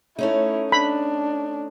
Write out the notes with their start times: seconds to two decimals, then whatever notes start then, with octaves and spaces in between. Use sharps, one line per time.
0.18 A3 C#4 D#4 E4
0.72 D4 B5